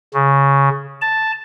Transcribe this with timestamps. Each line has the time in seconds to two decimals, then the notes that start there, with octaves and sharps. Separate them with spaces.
0.14 C#3
1.01 A5